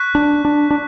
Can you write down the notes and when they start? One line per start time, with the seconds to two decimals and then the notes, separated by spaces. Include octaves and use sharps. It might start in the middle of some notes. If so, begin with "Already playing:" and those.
Already playing: C#6 F#6 B6
0.15 D4
0.45 D4
0.71 D4